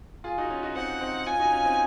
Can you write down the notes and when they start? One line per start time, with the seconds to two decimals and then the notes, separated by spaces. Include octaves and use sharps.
0.24 F4 G#4
0.38 D#4 F#4
0.50 C#4 F4
0.63 D#4 F#4
0.75 C4 D#4 F#5
1.01 C4 D#4
1.27 C#4 F4 G#5
1.39 D#4 F#4
1.52 C#4 F4
1.64 C4 D#4